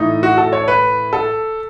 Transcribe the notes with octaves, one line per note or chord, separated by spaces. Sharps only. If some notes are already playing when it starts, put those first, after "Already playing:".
Already playing: A2 E3 A3 D#4
F#4
A4
C#5
B4
A4